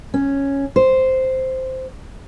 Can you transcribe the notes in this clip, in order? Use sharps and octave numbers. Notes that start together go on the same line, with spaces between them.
C#4
C5